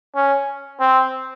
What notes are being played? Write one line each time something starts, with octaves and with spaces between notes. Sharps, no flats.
C#4
C4